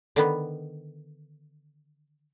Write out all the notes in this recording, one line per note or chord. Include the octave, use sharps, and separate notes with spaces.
D3 D#3 B3